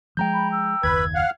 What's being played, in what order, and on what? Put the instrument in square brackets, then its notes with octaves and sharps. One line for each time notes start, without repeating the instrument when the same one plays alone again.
[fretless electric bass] F3 G3 G#3 [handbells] G5 A#5 G6
[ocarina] B5
E6
[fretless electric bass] F#1 D#2 [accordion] B4 B5 [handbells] G#6
[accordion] F5 F#5